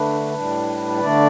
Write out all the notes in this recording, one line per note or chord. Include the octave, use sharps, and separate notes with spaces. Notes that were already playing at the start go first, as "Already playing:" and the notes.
Already playing: D3 A3 D4 B4
A2 G3 D4
D3 A3 D4 D5